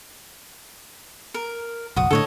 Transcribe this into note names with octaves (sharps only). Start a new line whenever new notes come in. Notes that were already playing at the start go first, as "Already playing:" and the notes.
A#4
F#1 B1 F#4 D#6
A2 D3 A4 C#5 D#5